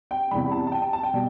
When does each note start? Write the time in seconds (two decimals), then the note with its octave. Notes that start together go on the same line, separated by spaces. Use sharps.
0.11 G5
0.31 E2 C3 G3 B5
0.52 A5
0.67 A5
0.72 G5
0.82 A5
0.93 A5
1.03 G5
1.13 B2 G3